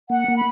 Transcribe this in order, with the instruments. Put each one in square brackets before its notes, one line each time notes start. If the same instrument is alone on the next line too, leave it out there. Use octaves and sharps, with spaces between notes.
[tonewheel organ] A#3 [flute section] F#5
[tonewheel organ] A#3
[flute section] B5